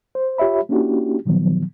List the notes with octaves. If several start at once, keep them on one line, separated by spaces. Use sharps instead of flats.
C5
F4 G4 C#5 E5 B5
A#3 C#4 D4 E4 F#4 G4
A#2 D#3 F3 F#3 B3